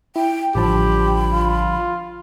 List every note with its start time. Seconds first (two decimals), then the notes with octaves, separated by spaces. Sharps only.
0.16 E4 G5
0.55 A1 D3 F3 G3 G4 A5 B5
1.32 F4